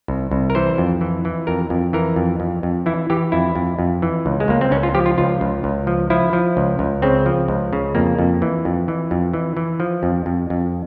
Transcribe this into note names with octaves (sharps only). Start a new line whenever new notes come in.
C2
C2
A#4
E3 C5
F2
E3
E3
F2 A#4
F2
E3 A#4
F2
F2
F2
E3 E4
E3 G4
F2 E4
F2
F2
E3
C#2
G#3
C#2 A#3
C4
C#2 C#4
F4
F3 G4
F4
C#2 F4
C#2
C#2
F3
F3 E4
F3
C#2
C#2
C#3 C4
F3
C#2
C#3
F2 A#3
F2
E3
F2
E3
F2
E3
E3
F3
F2
F2
F2